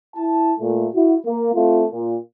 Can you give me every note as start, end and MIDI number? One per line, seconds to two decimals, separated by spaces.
0.16 0.52 64
0.16 0.52 81
0.59 0.87 46
0.59 0.87 57
0.95 1.15 64
0.95 1.15 66
1.26 1.53 58
1.55 1.85 57
1.55 1.85 60
1.55 1.85 65
1.91 2.16 46